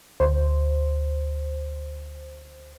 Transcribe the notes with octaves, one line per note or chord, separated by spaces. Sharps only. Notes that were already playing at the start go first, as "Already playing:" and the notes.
D2 C5